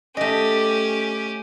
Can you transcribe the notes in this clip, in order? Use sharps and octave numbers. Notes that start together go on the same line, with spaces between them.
A3 C#4 G4 D#5